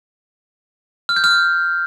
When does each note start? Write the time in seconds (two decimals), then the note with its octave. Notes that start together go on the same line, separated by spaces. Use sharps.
1.09 F6
1.16 G6
1.24 F6